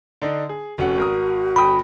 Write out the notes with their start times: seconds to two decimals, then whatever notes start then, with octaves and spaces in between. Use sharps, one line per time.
0.22 D3 D4 D#4
0.49 G#4
0.78 F1 C#4 F#4 F#5
0.97 G#1 A#4 D#6
1.56 G1 G5 B5 D#6